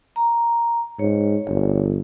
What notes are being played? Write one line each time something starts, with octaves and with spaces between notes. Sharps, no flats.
A#5
G#2 C#5
G1